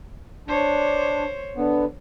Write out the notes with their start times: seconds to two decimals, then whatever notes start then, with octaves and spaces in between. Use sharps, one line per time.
0.48 D4 C5 C#5
1.57 D3 B3